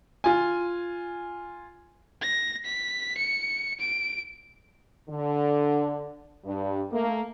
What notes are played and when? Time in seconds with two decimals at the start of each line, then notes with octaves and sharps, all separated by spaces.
0.24 F4 G#5
2.21 A#6
2.65 B6
3.17 C#7
3.80 D7
5.09 D3
6.45 G2
6.92 A3 A#3